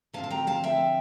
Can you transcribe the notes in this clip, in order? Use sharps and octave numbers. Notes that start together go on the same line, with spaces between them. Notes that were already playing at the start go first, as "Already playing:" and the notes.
D3 F3 C4 F5 A5
A5
G5 A#5
F5 A5
E5 G5